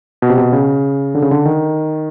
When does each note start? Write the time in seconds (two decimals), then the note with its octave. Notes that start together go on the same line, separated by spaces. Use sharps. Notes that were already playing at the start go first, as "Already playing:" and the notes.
0.22 B2
0.30 C3
0.38 B2
0.52 C#3
1.15 D3
1.22 C#3
1.31 D3
1.45 D#3